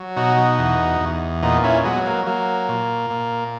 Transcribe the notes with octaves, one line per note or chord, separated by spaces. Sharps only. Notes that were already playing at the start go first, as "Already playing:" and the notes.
Already playing: F#3
B2 D#4 F#4
E2
E2
A#2 B3 D#4
C#4 E4
F#3 G#3 B3
A#3
F#3 A#3
A#2
A#2